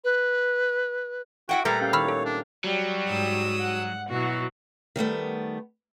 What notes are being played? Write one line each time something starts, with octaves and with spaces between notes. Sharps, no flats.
B4
E4 F#4 F#5 G5
A#2 G3 A3 A#4 B4 A#5
C#4 G4 F5 G5
D#3 E4 C#5 B5 E6 F6
A4
D4
F#3 G3
G#2 D#6 E6
F#5
B2 E3 F#3 F#4
D#3 G3 A3 B3